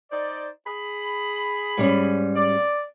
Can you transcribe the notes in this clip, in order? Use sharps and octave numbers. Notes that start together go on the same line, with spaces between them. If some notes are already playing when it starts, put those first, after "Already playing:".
D#4 C5 D5
G#4 B5
G#2 G3 C#4
D5